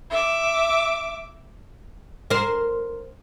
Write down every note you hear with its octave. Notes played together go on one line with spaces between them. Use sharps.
E5 D6
A#4 C5